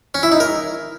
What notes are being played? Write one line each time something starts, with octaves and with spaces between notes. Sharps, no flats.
C#4
E4
D#4
A#4